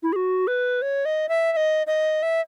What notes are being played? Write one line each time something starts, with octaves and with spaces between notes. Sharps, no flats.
E4
G#4
F#4
B4
C#5
D#5
E5
E5
D#5
D#5
E5